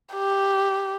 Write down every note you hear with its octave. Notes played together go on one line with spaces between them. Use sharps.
G4